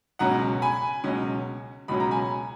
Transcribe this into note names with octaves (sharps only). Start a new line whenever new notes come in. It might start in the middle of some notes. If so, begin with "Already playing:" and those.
C#2 B2 F#3 C#4 F#5 A#5
G#5 B5
C#2 B2 F#3 C#4
C#2 B2 F#3 C#4 B5
A#5
G#5 B5